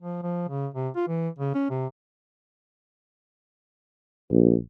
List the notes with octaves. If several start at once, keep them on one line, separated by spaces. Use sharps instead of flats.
F3
F3
C#3
C3
F4
E3
C#3
C#4
C3
A#1